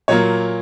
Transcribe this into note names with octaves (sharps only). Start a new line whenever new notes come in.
A#2 F#3 A#3 C#5